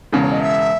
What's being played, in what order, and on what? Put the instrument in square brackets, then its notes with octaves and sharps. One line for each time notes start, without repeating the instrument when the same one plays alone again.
[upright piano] E1 E2 C#3
[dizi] C#5
D#5
E5